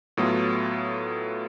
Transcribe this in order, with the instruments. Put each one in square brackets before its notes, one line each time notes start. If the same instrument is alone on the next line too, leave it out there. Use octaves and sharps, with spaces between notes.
[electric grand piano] A2 F#3 B3 F4 A4